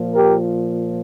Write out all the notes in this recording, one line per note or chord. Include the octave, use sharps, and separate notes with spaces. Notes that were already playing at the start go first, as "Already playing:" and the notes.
Already playing: A#2 F3
G4 A#4